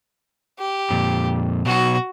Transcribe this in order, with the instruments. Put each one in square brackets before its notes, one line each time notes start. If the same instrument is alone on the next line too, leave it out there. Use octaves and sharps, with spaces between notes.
[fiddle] G4
[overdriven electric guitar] F2 A#2
[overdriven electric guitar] B2 F#3 [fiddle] F#4